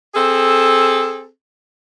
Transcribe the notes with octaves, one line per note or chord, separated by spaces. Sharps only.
C4 G#4 A4